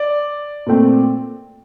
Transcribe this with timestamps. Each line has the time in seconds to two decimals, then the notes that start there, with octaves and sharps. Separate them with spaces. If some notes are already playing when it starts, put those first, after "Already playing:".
Already playing: D5
0.66 A#2 A3 C4